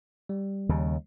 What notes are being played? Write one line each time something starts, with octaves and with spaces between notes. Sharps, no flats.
G3
D#2 C#3